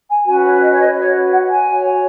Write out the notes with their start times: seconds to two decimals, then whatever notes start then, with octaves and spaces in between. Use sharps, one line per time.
0.08 G#5
0.25 C#4 F#4 B4 G#5
0.44 C#5
0.61 D#5
0.71 C#5
0.79 D#5
0.96 F#4 B4 C#5
1.31 F#5
1.48 G#5
1.66 F#4 C#5